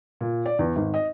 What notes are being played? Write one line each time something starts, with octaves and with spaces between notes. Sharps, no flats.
A#2
D5
E2
G#1
D#5